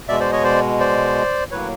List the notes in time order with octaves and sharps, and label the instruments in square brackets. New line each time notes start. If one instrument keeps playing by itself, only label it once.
[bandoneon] B2 G#3 D5 E5
C5 D5
C#5 D#5
C5 D5
C5 D5
A2 F#3 A#3 B4 C#5